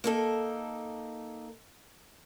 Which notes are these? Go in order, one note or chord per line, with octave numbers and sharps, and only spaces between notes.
A#3 D#4 A4